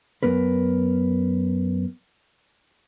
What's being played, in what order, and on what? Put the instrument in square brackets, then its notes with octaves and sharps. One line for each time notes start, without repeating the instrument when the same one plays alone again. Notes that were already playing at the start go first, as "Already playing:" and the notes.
[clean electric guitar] F#2 B3 A#4 B4